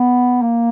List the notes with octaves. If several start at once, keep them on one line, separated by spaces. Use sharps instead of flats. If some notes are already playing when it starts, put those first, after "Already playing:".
Already playing: B3
A#3